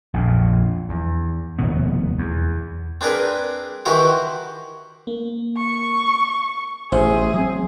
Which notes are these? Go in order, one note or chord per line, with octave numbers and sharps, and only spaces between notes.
A#1 F2 A#2
E2
F1 D#2 B2 B3
E2
C4 D4 G#4 A#4 B4
D#3 E3 E4 F#4 G4 C5
A#3
C#6
A1 G#4 C5 E5
F#3 C4